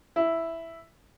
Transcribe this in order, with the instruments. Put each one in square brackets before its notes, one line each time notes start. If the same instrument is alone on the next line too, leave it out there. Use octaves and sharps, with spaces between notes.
[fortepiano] E4